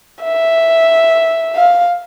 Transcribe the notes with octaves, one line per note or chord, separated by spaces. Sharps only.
E5
F5